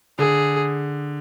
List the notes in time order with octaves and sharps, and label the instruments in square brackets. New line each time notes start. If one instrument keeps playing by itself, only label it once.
[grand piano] D3 [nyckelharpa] G#4